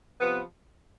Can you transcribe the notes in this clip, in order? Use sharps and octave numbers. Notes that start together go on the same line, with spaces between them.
C3 F3 B3